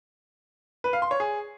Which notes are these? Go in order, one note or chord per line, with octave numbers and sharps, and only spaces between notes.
B4
F5
C6
C#5
G#4